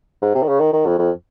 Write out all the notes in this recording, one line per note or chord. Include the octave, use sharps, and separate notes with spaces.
G#2
C3
D#3
C#3
D#3
D#3
F2
F2